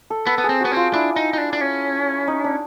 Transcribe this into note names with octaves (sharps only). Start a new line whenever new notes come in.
A4
B3 A4
B3
G#4
C4
B3 F#4
C4 F4
D4 E4
D#4
D#4
D4
D4
C#4
D#4
D4